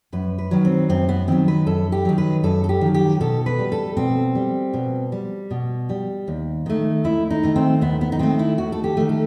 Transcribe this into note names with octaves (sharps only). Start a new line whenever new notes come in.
F#2 B4
B4
D#3 F#3
C4
F#2 C4
B3
D#3 F#3 C4
B4
F#2 A4
G4
D#3 F#3
B4
F#2 A4
A4
G4
D#3 F#3
G4
B2 A4
B4
G3
A4
B2 C4
G3
B2
G3
B2
G3
D#2
D#3 A3
D#2 E4
D#4
D#3 A3
C4
D#2 B3
B3
D#4
D#3 A3 C4
E4
D#2 F#4
A4
G4
D#3 A3
A4